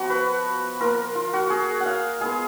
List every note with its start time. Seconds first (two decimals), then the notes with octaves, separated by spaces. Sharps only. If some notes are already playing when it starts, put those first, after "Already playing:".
Already playing: F3 B3 F#4
0.10 B4
0.80 A#3 F4 A#4
1.15 F4
1.33 F#4
1.50 G#4
1.81 F#5
1.86 F5
2.20 G#3 B3 F4 G#4